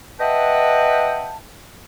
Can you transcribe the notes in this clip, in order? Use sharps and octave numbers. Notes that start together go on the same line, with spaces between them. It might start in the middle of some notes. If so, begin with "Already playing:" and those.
B4 D#5 E5 F#5 G5 A5